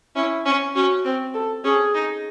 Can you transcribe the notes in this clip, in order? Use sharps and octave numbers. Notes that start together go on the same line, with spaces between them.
C#4 E4
C#4
C#4 F#4
C4
A4
C#4 G#4
D#4